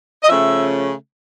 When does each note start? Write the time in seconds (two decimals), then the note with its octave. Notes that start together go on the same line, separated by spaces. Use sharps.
0.23 D#5
0.28 C#3 F3 A3 C#4 E5